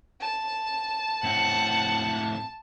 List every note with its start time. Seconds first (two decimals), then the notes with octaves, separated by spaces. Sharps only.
0.20 A5
1.24 A2 C4 F#5